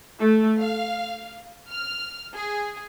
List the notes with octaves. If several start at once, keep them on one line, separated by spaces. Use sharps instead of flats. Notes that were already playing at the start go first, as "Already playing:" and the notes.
A3
F5
F6
G#4